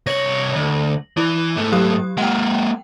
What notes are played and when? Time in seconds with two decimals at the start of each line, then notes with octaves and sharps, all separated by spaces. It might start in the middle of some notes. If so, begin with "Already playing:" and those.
0.06 C2 C#5 A#6 F#7
0.56 D2
1.17 E3 E4
1.56 G#2 A3
1.72 F#3 G4 D#6
2.18 G#3 A#3 F#5 G5